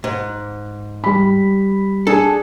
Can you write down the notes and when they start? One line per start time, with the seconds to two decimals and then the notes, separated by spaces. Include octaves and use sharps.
0.04 G#2
1.04 G3 B5
2.07 D4 G#4 A4